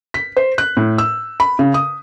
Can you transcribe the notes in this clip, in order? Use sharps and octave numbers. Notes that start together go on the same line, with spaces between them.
B6
C5
F#6
A2
E6
B5
C#3
D#6